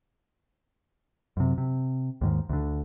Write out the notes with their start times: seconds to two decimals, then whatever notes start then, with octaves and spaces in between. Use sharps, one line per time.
1.37 F#2 C3
1.58 C3
2.21 D#2 G#2 D#3
2.49 D2 D3